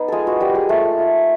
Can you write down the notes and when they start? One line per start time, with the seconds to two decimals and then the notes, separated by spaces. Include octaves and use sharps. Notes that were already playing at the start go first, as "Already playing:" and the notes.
Already playing: B3 D#4 B4
0.08 G#3 F4 G#4 A4
0.27 F#4
0.40 G3 A#3 G4
0.55 G#3 G#4
0.69 A3 F4 A4
0.98 F4